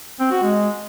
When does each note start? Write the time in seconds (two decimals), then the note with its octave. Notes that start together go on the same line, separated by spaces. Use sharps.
0.20 C4
0.31 F#4
0.43 G#3